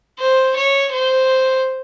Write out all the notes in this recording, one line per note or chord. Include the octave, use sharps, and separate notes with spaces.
C5
C#5
C5